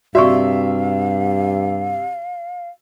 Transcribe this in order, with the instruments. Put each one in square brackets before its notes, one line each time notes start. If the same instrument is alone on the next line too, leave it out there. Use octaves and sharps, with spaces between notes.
[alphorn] G2 [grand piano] C3 E5 [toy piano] F#4 D5 C#6 [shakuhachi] F5